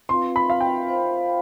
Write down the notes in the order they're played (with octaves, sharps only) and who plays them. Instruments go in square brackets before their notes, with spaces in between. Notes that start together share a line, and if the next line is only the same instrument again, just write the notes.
[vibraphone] C4 F4 B4 F5 [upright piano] C6
[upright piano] B5
F5
G5
[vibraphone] F4 C5 F5